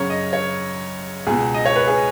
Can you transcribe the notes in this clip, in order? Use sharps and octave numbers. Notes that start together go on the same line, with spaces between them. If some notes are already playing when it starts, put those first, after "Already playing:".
Already playing: F#2 C#3 C#5
D#5
C#5
C#2 B2 G#4
D#5
C#5
B4
G#4